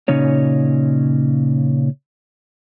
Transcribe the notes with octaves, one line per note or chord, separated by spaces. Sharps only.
A#2 C#3 C#4 D#4 C#5